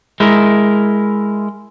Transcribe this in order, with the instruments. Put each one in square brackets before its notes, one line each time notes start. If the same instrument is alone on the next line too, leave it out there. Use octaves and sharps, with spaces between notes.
[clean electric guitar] G#3 E4 A#4